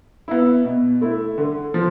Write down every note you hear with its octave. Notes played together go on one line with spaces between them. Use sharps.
B3 E4
B2
A3 E4
D3
F3